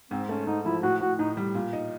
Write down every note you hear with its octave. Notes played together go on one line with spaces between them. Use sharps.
G#2 C4
A3 C#4
G#2 D#4
F3 E4
A2 F#4
A2 F#4
A2 D#4
G3
A#2
D#4